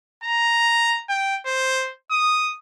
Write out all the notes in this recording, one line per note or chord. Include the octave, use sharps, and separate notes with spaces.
A#5
G5
C5
D#6